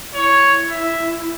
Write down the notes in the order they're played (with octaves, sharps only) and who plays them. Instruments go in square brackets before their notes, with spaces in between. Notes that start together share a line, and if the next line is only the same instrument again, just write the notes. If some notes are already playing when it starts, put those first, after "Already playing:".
[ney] E4 [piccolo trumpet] C#5
[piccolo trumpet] E5